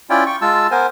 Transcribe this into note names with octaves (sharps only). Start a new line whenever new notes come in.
C#4 E4 F4 D5 G5
G5 C#6
G#3 F4 A5 E6
B3 A#4 C5 G#5